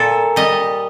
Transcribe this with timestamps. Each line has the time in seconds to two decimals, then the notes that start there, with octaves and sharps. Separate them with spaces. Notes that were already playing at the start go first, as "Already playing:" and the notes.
Already playing: A#2 A4
0.36 G3 D#5